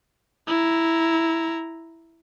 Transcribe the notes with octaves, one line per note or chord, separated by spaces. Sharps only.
E4 A#5